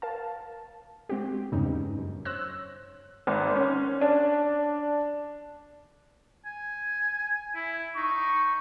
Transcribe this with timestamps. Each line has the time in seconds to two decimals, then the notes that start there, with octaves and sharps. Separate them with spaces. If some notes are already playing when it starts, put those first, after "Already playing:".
0.02 A#4 F5 A5
1.09 G#3 C4 F#4 G4
1.52 E2 G2 C#3 G#3 C#4 D#4
1.99 F#2
2.25 C5 C#5 E6 F#6 A#6
3.27 G#1
3.56 C#4
4.01 D4
6.45 G#5
7.55 E4
7.96 D#4 C#6